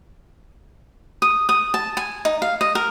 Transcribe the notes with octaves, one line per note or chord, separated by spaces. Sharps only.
D#6
D#6
A5
G#5
D#4
F5
D#5
A#4